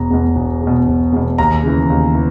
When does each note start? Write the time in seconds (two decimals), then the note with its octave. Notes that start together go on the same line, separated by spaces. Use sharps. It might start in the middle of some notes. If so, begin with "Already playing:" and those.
Already playing: E1 E2 B2 A#5
0.10 E2 B2
0.36 E1
0.62 E2
0.67 B2
0.88 E1
1.13 E2 B2
1.38 D#2 A#5
1.63 C#3 E3
1.90 D#2
2.15 E3